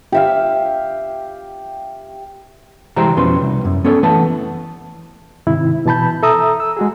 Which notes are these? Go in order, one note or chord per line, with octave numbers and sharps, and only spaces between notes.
G4 E5 F5
C2 E3 G#3 G4 C5 A#5
F2 B2 C#4 B4 C6
C2
F#2
B3 C#4 A4 C#5
E3 A3 B3 B4 A5
G#2 C3 D#3 E4
B2 E3 A5 B5 G6
A4 E5 A#5 D#6 E6
E6
G#3 F#4 G#4